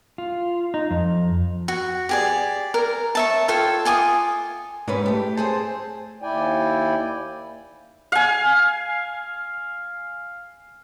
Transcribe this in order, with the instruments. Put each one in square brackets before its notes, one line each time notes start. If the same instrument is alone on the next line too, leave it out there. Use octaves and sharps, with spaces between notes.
[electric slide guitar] F4
D#4
F2
[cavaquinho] F#4
G4 G#4 D5
A#4
C#5 E5 A5
F4 A4 C#5 G5
F4 G#5 D6 D#6
[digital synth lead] G#2 [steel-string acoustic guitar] G3 C#4 B4
[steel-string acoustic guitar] A3 G4
[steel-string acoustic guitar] C4 G#4 A5 [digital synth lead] C5
[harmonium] D#2 E4 D5 G5 G#5
[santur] F5 G#5